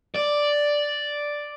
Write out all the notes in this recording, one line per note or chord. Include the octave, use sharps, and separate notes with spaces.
D5